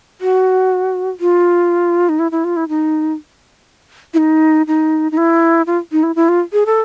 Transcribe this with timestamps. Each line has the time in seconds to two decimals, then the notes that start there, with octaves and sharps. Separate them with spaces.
0.21 F#4
1.20 F4
2.09 D#4
2.19 E4
2.32 E4
2.44 F4
2.56 E4
2.69 D#4
4.14 E4
4.18 D#4
4.67 D#4
5.12 D#4
5.17 E4
5.67 F4
5.92 D#4
6.03 E4
6.16 E4
6.29 F4
6.53 G#4
6.66 A4